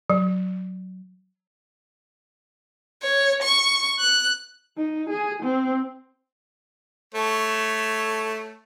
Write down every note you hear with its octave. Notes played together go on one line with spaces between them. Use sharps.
F#3
C#5
C#6
F#6
D#4
G#4
C4
A3 A4 C#5